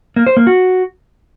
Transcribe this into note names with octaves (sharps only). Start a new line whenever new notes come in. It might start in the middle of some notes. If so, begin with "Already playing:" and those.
A#3
C5
A#3
F#4